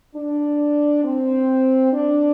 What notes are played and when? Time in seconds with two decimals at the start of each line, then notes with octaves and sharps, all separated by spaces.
0.15 D4
1.04 C4
1.93 D4